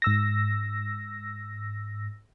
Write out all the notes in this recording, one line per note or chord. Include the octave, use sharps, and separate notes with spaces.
G#2 E6 A#6